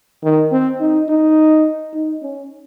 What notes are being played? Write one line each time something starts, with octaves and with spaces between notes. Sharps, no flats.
D#3
C4
D#4
D#4
D#4
C#4